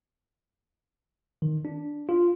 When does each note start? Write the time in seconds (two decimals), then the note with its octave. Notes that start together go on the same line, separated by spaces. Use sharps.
1.42 D#3
1.65 D4
2.09 F4